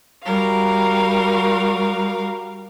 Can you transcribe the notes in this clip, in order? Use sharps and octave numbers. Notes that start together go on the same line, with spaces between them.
G3 F#4 A#4 F5